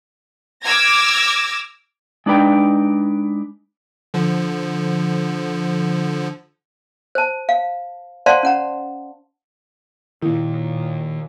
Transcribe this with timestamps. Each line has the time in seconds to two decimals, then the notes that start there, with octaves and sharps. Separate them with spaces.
0.63 D6 E6 F6 G#6 A#6
2.26 G#3 D4 D#4 B4 G5
4.14 D3 F3
7.15 C5 A5
7.49 F5
8.26 C5 D5 F5 F#5 A5 C6
8.43 C#4 F#5 A#5
10.22 A#2 D#3 A#3 E4